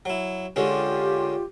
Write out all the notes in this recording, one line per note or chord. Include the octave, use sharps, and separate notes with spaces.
F#3 E4
D3 G#3 C#4 F4 G4